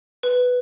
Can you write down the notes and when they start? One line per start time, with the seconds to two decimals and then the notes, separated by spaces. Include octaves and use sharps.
0.23 B4